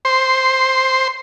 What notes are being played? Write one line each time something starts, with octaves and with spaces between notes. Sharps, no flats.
C5